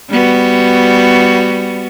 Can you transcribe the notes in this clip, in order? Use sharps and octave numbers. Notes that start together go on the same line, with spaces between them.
G3 B3 F#4